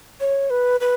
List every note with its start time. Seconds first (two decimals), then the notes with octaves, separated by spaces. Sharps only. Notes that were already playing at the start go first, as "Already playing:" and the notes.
0.21 C#5
0.50 B4
0.80 B4